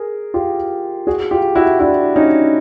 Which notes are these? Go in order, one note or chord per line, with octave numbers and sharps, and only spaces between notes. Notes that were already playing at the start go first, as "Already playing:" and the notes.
Already playing: G#4 A#4
F4 G4
F#4 G#4
F4 G4
E4 F#4
D4 E4
C#4 D#4